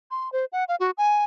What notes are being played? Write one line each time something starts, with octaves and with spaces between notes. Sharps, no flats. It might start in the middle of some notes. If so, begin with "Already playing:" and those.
C6
C5
F#5
F5
F#4
G#5